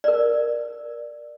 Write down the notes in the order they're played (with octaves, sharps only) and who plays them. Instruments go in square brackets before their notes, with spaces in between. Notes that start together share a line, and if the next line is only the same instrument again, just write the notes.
[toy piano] A#4 D5